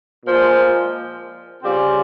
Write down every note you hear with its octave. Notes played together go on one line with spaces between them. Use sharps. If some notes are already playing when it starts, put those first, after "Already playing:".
A#2 F3 G#3
C#3 G3 C4 F4 G#4